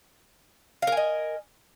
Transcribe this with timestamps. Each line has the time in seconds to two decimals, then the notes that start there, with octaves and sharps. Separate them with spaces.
0.82 F5
0.87 A#4
0.92 G#5
0.97 D#5